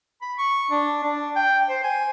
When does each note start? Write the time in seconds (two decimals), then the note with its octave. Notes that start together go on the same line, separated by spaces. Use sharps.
0.22 B5
0.38 C#6
0.71 D4
1.03 D4
1.36 G5
1.69 C5
1.84 G#5